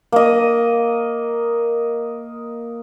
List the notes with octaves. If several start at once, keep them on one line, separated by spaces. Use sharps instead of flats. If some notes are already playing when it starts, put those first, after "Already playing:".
A#3 D#5